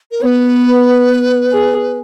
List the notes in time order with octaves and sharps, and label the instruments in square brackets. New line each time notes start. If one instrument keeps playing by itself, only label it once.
[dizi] A#4
[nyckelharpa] B3 [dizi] C#5
[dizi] B4
[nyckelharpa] G#4